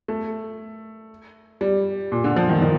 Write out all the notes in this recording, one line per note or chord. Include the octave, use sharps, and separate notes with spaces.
A3
G3
A#2
D3
F3
D#3
D#3